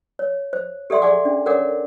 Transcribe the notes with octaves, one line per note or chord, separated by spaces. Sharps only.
C#5
C5
G4 A4 D5 E5 F#5 C6
G#4 D5 F#5 G#5 D6
C#4 D4
A4 A#4 C#5 D5 F#5 D6